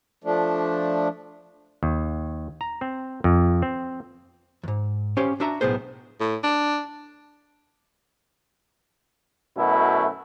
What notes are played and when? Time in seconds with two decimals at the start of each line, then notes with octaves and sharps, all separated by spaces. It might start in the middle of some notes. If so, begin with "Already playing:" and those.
0.24 F3 A3 D4
1.83 D#2
2.61 A#5
2.81 C4
3.24 F2
3.62 C4
4.63 E2 G#2
5.17 C#4 G4 C5 F5
5.40 D4 F#4 E5 A5 A#5
5.61 B1 A2 B3 G#4 C5
6.20 A2
6.44 D4
9.57 F#2 B2 A3 E4